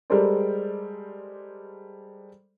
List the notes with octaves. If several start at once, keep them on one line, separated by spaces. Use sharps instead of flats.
G3 G#3 A4 A#4 C5 D5